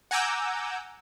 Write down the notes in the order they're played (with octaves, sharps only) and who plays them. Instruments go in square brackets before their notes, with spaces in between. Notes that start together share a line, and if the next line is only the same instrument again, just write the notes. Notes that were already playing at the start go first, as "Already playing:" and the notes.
[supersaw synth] F#5 G#5 A#5 D6 E6 G6